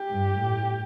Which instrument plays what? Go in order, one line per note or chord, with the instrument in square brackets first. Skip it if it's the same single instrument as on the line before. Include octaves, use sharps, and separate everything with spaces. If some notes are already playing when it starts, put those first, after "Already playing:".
Already playing: [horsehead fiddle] G4
[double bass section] G2
A2